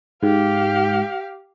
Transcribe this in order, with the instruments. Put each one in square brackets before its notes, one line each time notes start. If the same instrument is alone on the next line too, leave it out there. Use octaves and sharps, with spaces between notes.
[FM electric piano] G#2 [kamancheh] G4 F5